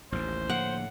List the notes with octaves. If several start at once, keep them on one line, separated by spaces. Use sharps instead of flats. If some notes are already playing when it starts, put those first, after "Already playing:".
A1 D#2 C5
A2 D3 F3 A#3 F#5